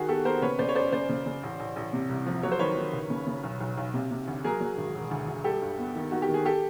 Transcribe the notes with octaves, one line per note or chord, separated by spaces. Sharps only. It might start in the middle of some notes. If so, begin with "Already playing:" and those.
Already playing: D#3 F#4 G#4
B3 G4 A4
B3 A#4 C5
C#3 B4 C#5
C#3 C5 D5
C#5
F#2 C5 D5
C#3 C5 D5
C#3
C#3
A1
A1
A1
C3
C2
F3
F#3 C#5
C5
D#3 B4 C#5
D#3
F#1
C#3
C#3
B1
B1
B1
C3
C3
D2
F#3 G#4 A#4
F#3
G#1
E1
D2
D2
G3 G4 A4
G2
B3
D#3
D#3 F#4
G4
D#3
G#4
G4 A4